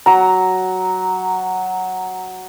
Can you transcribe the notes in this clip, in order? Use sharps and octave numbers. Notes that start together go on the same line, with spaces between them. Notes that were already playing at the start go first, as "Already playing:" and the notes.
F#3 A#5